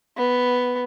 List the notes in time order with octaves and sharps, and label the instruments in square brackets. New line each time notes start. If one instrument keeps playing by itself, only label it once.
[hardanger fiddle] B3